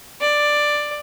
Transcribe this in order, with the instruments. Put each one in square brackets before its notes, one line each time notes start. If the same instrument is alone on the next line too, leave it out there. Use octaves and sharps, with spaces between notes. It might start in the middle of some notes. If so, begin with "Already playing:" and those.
[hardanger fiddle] D5